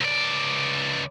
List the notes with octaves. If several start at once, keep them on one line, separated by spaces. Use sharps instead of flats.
C#2 D5